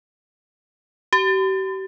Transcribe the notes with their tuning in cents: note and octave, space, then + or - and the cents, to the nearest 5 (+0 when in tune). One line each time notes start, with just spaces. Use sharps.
G4 -40